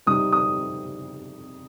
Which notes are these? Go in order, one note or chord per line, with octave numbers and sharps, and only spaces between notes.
C3 G3 C4 D#4 D#6
D#6